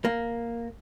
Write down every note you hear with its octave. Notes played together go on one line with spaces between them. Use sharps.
A#3